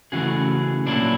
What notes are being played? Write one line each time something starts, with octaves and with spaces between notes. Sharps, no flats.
C#3 E3 A3 F#4 G#4
A#2 F#3 A#3 D4 E4